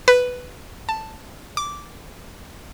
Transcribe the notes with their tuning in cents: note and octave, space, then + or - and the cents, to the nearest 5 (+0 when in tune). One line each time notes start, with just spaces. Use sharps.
B4 +5
A5 +5
D6 -10